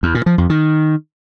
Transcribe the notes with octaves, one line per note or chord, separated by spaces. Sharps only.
E2
A#2
F3
F2
D#3